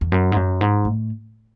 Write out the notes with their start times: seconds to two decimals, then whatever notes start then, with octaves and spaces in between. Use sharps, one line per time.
0.01 E2
0.12 F#2
0.32 G#2
0.36 F#2
0.61 G#2
0.85 A2